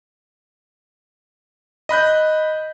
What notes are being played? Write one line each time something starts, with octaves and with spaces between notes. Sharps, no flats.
D#5 B5 F#6 G6